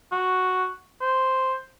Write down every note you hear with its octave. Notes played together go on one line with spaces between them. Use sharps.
F#4
C5